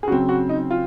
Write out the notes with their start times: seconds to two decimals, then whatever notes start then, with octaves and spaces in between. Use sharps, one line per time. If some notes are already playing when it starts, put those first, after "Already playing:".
0.03 G#4
0.08 C#3 F#4
0.10 F#3 C4
0.29 F#4
0.49 D#4
0.71 F4